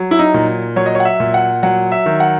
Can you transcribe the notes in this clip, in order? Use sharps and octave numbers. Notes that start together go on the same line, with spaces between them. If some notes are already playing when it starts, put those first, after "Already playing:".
Already playing: F#3
E4
D#4
A#2
F#3 C#5
D#5
C#5
F#5
E5
A#2
F#5
F#3 F#5
E5
D#3
F#5